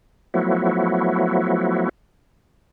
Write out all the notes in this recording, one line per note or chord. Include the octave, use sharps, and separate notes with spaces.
F3 F#3 A3 B3 E4 F#4